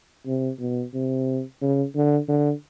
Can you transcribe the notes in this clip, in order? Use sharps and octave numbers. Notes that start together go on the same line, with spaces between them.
C3
B2
C3
C#3
D3
D3